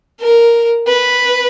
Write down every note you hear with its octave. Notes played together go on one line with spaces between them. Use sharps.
A#4
B4